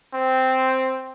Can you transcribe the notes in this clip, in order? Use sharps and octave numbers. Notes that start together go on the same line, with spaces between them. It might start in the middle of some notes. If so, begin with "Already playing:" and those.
C4